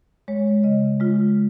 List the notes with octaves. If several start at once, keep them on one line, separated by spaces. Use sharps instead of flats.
G#3 C#5
C#3 D#5
G#3 F4